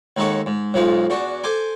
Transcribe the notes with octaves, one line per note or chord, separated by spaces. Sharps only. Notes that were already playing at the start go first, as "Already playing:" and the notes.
D#2 G#3 D#4 A4 C#5 F#5
G#2
B1 F2 F3 G#3 D#4
E2 D4 F#4
A4 C5 G#5 D6